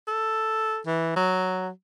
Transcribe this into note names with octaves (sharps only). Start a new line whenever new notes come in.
A4
E3
F#3